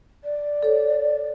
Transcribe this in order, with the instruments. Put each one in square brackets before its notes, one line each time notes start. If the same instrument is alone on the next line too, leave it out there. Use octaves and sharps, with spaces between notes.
[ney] D5
[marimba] A4 C#5